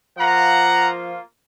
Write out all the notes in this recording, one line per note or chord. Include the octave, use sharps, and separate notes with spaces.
F3 A#3 F4 F#5 A#5